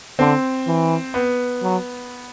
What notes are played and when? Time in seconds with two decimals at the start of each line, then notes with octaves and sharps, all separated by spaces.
0.19 D3 C4
0.67 E3
1.14 B3
1.62 F#3